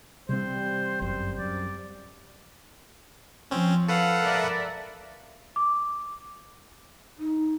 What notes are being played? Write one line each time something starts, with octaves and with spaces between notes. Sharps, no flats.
C3 E3 G3 C4 C5
G1 F#2 C5
F#2 D5
F3 C4 C#4
A4 B4 F5 F#5
A#4 D5 E5
D6
D#4